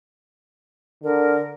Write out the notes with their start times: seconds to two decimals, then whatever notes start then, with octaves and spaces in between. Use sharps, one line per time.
1.04 D3 A#4